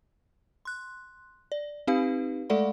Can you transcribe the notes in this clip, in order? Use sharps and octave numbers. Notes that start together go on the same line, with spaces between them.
C6 F#6
D5
C4 D#4 G4 B4 F5
G#3 A3 A4 D5 F#5 B5